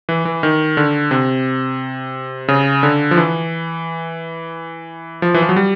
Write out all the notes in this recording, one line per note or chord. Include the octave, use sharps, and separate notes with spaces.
E3
E3
D#3
D3
C3
C#3
D3
F3
E3
F3
E3
F3
F#3
G3